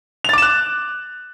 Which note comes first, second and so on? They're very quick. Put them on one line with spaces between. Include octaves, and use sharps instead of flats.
F7 A6 D6 E7 F#6